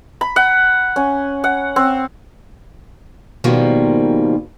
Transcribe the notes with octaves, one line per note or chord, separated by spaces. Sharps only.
B5
F#5
C#4
F#5
C4
G#2 B2 D#3 F3 G3 A#3